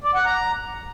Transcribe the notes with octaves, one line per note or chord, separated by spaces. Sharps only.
D5
F#5
A#5